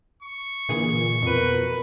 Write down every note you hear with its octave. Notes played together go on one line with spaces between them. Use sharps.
C#6
A#2 D3 E3 G#4
F2 B2 A#4 B4 D#7